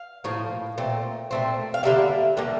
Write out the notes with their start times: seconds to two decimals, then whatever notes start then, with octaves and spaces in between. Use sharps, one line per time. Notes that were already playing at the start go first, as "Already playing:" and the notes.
Already playing: F5
0.24 A2 F3 A#3
0.78 A#2 A3 C4
1.31 A#2 A3 C4
1.74 F5
1.83 D3 G3 A#3 E5
2.37 D3 G3 A#3